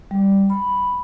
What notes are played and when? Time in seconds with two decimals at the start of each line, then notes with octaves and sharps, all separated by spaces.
0.11 G3
0.50 B5